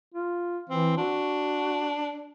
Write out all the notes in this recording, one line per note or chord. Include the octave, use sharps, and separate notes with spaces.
F4
E3 C4
D4 F#4